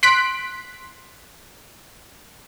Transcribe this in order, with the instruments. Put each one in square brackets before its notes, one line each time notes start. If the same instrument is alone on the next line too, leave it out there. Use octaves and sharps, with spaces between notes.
[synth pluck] C6 F#6 B6 D7